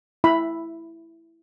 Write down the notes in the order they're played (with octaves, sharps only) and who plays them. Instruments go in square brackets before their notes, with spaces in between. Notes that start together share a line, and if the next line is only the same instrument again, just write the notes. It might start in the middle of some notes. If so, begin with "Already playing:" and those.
[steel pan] E4 E5 B5